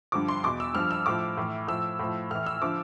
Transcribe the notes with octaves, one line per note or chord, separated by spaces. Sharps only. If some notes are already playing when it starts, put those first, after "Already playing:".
G2 D3 F3 D6
C6
E2 B2 D6
E6
G2 F3 F6
E6
A2 F3 D6
A2 E3
A2 F3 E6
A2 F3
A2 E3 F6
E6
D3 F3 D6